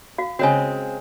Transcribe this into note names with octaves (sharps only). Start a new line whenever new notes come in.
F#4 F5
C#3 G#3 C4 F#4 C#5 G#5